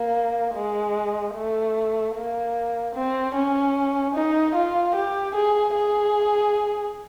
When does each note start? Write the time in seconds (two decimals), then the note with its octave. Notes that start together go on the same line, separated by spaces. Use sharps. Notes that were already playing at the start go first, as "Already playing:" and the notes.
Already playing: A#3
0.55 G#3
1.35 A3
2.15 A#3
2.95 C4
3.35 C#4
4.15 D#4
4.55 F4
4.96 G4
5.35 G#4
5.76 G#4